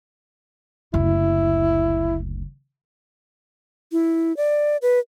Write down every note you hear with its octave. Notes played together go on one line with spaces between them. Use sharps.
F#1 D2 E4
E4
D5
B4